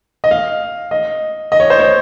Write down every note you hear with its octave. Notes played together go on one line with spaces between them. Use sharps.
D#5
F5
D#5
D#5
C#5
C5
C#5